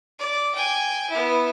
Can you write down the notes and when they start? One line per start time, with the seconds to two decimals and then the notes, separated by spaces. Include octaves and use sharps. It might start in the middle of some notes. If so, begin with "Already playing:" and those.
0.19 D5
0.55 G5 G#5
1.10 B3 E4